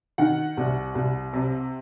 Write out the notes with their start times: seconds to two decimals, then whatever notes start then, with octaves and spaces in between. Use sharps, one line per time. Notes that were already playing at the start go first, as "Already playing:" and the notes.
0.18 D#3 F#5
0.57 C2
0.95 C2
1.33 C3